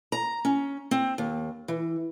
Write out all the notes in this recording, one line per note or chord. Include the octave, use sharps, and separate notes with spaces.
A#5
C#4
C4
D#2
E3